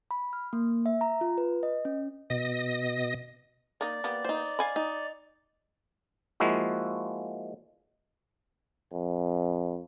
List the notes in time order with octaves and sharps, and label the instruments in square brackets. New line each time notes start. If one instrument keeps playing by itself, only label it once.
[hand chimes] B5
F6
A#3
E5
A#5
F4
B4
D#5
C#4
[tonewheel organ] B2 D#5 A#6
[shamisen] A#3 D#4 [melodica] D5
[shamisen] A#3 B3 G4
[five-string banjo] D#4 C5
[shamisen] F5 G#5 B5
[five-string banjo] D#4
[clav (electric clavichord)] F3 G#3 A#3 E4 F#4
[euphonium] F2